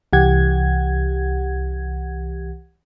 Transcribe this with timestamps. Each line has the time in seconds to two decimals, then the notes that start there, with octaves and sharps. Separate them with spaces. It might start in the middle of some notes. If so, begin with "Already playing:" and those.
0.13 C2 E3 G4 F#5 G#6